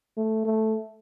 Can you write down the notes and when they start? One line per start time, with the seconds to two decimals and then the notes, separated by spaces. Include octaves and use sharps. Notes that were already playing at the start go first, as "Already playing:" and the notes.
0.17 A3
0.46 A3